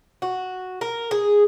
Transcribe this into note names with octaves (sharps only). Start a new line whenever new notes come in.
F#4
A#4
G#4